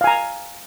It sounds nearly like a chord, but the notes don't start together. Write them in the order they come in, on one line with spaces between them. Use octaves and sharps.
F5 G#5 A#5